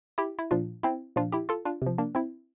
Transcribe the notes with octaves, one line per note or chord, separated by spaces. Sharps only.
E4 G4
E4
A#2 F3 D4 F4
C4 E4
A#2 F3 D4 F4
E4 G4
F4 A4
D4 F4
C3 F3
A#3 D4
C4 E4